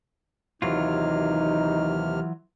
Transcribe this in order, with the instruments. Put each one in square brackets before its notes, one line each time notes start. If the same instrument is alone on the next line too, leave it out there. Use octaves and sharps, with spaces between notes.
[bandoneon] D#2 C3 F6 [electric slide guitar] E3 F#3 F4 [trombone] D#4